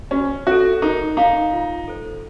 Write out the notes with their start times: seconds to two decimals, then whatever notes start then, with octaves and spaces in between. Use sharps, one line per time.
0.11 C#4 F#4
0.47 F#4 A4 C#5
0.82 D#4 A#4
1.17 D#4 F5 A#5
1.53 F4
1.88 A4 C5